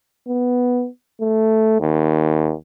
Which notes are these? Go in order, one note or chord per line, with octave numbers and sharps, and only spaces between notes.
B3
A3
D#2